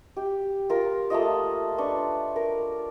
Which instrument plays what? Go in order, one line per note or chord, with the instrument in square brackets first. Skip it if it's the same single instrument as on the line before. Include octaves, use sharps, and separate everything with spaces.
[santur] G4
F4 A#4
A3 A#3 F4 D#5
D4 B4 C#6
A#4